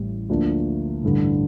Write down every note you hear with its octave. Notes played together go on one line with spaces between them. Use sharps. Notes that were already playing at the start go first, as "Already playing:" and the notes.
Already playing: A1 A2 G3
D2 D3 F3 A#3 D4
A1 G2 D3